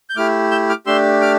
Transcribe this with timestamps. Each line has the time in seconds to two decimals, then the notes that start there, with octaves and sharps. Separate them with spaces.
0.10 G6
0.16 A3 E4 G4 D6 F6
0.51 E6 G6
0.69 D6 F6
0.86 A3 D4 G4 C6 E6
1.21 D6 F6